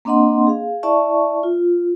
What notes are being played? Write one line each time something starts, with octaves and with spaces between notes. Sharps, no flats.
A#3 C4 D4 D#5 F#5 C6
G#4 F5
E4 D5 E5 A5 C#6
F4